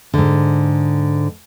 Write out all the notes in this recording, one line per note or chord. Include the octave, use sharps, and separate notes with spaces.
G#2 D3